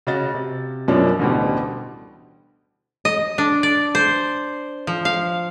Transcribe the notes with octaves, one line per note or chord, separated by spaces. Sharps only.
C#3 F#4 D#5 A6
C3
F#2 B2 F3 A#3 C#4 D4
A1 D2 B2 D3 G3
D#5
D4
D5
C5
F3
F5